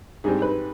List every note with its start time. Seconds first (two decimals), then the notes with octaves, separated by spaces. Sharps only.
0.24 G#2 G3 C4 G#4
0.42 B4